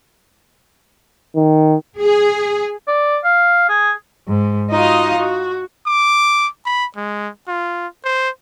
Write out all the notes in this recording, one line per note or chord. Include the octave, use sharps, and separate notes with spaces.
D#3
G#4
D5
F5
G#4
G#2
D#4 F4 F#4 D#5 F5
F#4
D6
B5
G#3
F4
C5